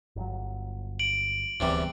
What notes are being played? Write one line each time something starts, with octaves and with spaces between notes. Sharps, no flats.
G1 F#3
D7 F#7
D1 E2 C3 G3